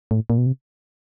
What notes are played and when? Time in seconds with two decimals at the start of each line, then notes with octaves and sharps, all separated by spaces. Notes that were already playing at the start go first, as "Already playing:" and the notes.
0.11 A2
0.30 A#2
0.38 B2
0.46 C3